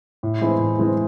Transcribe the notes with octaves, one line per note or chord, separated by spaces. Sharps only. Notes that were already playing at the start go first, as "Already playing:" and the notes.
A2
E3 G#3 C4 E4
A2
E3 G#3 C4 E4